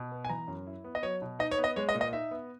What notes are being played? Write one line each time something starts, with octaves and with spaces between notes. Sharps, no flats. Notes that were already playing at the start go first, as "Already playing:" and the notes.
Already playing: B2
B3
G#5
E3 A#5
F#2
E4
B3
D#5
F#3 C#5
B2
D#4 D#5
C#5
B3
D#5
G#3 C#5
D#5
A#2
D#5
D#4 E5
B3